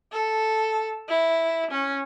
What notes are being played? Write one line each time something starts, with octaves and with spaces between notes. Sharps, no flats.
A4
E4
C#4